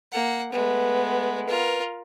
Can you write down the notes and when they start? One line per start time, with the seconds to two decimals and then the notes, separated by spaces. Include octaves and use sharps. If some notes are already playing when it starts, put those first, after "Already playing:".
0.12 A#3 F#5
0.53 G#3 A3 B3 B4
1.48 F4 A#4 B4